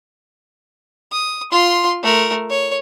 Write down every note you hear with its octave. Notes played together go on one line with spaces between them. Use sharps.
D#6
F4 C6
A3 A#4
C#5